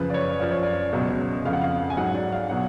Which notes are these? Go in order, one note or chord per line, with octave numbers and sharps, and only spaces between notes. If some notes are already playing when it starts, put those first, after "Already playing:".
Already playing: F#2 C#3 F3 B4
D5
C#5
F#2 F3 D5
C#5
D5
C#2 B2 F#3
F2 C#3 F3 F5
F#5
F5
G#5
G#2 F#3 F#5
D5
F5
B2 F#3 F#5